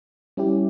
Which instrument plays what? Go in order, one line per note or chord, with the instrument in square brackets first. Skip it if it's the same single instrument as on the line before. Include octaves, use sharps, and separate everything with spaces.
[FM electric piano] G3 C#4 E4 G4